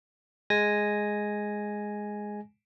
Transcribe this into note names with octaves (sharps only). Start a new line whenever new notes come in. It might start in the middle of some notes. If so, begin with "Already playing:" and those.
G#3 G#5 A#6